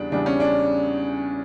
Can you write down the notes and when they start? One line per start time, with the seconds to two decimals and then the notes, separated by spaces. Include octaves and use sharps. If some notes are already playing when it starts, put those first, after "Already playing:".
Already playing: E2 C#3 G3 D4
0.12 E2 C#3 G3 D4
0.26 C#4
0.40 D4